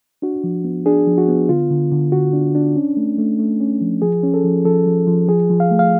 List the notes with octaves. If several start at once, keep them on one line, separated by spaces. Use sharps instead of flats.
D4 F#4
F3
B3
D4 G#4
F3
F#4
B3
D3 F4
D3
D3
D3 F#4
D4
D4
C#4
A3
A3
A3
C#4
F3
F3 G#4
C#4
A4
F3
F3 A4
F3
F3
F3 G#4
F3
F5
A3
F5